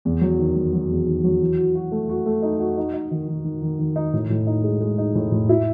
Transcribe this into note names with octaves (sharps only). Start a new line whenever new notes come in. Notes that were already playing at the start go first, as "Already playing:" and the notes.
E2
F#3
D#3
F#3
F#3
E2
D#3
F#3
E3
F#4
F#4
A3
F#4
A3
D#4
F#4
D#4
D#4
D#3
D#3
D#3
D#3
D#3
D#4
A2
A2
D#4
G#3
G#3
D#4
A2
A2
E4